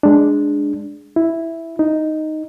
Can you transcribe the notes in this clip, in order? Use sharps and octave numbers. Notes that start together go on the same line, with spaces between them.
G#3 D4
E4
D#4